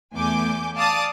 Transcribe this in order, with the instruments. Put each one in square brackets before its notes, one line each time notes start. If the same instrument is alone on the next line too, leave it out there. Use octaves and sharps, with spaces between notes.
[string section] E2 A3 G#5 D6 G6
D5 F5 A5 D6 D#6 A6